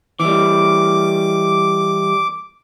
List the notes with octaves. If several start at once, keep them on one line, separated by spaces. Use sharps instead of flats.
E3 G3 D6